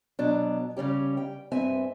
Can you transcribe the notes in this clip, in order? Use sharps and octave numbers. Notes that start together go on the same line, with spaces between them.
B2 F#3 D4
C#3 G3 C#4 G4
G5
G2 C4 E5 G#5